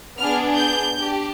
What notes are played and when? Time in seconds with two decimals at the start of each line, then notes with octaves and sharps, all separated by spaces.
0.18 B3 D4 G#4 F6
0.58 G6
0.97 D4 G4